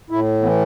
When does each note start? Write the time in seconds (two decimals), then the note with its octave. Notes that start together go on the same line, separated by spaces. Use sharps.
0.10 A2 E4
0.43 E3 B3